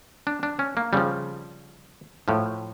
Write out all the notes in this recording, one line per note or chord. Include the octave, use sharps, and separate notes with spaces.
D4
D4
C#4
A#3
C#3 F3 G3
A2 F3